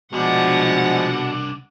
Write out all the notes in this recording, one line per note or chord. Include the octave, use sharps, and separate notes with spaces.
C2 B2 F3 G#3 D4 F#5